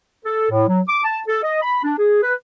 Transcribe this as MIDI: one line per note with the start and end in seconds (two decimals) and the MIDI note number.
0.25 0.47 69
0.51 0.67 45
0.68 0.81 54
0.89 1.02 86
1.04 1.19 81
1.27 1.39 69
1.43 1.58 75
1.62 1.80 83
1.83 1.94 62
1.98 2.21 68
2.23 2.34 71